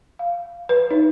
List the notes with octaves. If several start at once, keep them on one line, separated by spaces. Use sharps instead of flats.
F5
B4
D#4